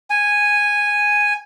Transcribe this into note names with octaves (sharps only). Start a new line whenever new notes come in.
G#5